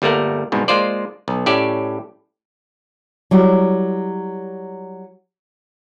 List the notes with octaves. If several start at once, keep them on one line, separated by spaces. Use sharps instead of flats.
G1 G3 A3 A#3 A#4 F#5
C2 G#2 B2
G#3 A#3 F4 C5 D5
B1
A2 C#4 G4 D5 E5
F#3 G3 E4